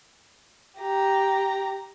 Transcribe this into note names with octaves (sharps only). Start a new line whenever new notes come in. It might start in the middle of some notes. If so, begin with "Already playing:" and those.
G4 A#5